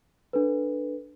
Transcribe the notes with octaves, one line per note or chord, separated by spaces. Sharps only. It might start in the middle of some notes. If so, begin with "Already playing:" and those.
D4 A4 B4